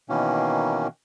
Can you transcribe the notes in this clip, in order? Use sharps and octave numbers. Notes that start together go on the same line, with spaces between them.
B2 D#3 E3 A#3 C#4